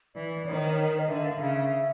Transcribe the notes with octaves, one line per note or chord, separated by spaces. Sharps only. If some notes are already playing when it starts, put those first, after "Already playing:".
E3 D5
D#3 C#5
C5
C#5
A#4
D#5
D3 E5
F5
C#3 E5